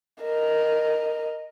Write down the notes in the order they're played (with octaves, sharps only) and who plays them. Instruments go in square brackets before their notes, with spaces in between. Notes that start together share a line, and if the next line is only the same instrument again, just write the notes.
[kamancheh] A#4 D#5